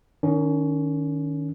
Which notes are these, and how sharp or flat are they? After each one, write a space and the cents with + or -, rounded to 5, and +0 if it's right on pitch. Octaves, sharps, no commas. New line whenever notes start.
D#3 -15 C#4 +25